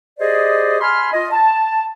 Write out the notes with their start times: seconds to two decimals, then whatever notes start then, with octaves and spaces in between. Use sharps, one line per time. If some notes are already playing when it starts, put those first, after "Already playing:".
0.19 G4 G#4 C5 D5 D#5
0.81 G#5 B5 C6 F6
1.12 F4 D#5
1.32 A5